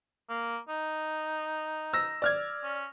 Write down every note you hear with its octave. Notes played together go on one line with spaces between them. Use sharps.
A#3
D#4
E6 A#6
D5 F6 G#6
C#4